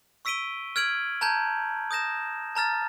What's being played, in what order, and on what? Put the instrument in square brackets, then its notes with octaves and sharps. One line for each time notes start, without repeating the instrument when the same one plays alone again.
[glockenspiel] C#6 E6 B6 D7 D#7 G7
F6 G#6 D7 F#7
A5 A#5 G6 G#6
D#6 G6 A#6 E7
A5 A#5 F6 A6